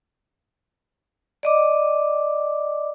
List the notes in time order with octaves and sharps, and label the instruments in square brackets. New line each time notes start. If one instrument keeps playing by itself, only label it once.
[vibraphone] D5 D#5 D6